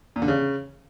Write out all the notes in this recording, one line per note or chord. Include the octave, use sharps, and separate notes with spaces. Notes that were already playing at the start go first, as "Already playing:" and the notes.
A#2
D3
C#3